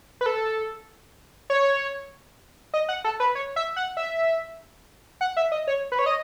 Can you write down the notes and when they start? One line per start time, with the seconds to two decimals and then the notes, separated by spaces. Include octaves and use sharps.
0.21 B4
0.26 A4
1.50 C#5
2.74 D#5
2.89 F#5
3.04 A4
3.20 B4
3.35 C#5
3.56 E5
3.76 F#5
3.97 E5
5.21 F#5
5.37 E5
5.52 D#5
5.67 C#5
5.92 B4
5.99 C#5
6.06 D#5